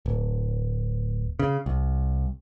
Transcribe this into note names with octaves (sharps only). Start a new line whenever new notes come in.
D1
C#3
C2